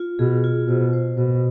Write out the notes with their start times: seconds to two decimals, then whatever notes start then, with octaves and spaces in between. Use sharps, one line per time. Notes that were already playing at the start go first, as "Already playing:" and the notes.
Already playing: F4
0.19 B2 G#4
0.44 F4
0.68 B2 C5
0.93 C5
1.17 B2 C5